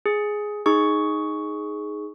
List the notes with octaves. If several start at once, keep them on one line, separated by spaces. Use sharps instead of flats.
G#4
D#4 G#4 C#6